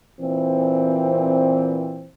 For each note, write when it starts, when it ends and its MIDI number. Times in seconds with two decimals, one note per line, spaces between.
0.21 2.10 46
0.21 2.10 52
0.21 2.10 60